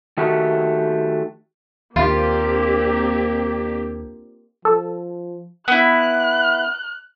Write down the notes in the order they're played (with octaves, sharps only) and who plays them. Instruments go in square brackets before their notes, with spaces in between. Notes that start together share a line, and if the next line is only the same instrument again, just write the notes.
[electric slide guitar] D#3 A3 F#4 G4
[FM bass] D#2 [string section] A#3 C4 [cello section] D4 G4 [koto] F4
[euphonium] F3 [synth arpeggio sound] A4
[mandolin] B3 E4 [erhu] F#6